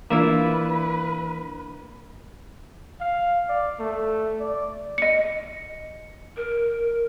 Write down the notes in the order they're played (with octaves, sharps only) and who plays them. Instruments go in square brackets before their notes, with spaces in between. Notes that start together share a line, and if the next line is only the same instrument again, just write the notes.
[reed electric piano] E3 D4 [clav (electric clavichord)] A#3 [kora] E4 F4 E5 [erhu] B4
[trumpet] F5
D5
A3
D5
[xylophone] D#5 C#7
[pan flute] A#4